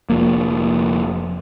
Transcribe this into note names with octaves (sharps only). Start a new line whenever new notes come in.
F1 F3 A#3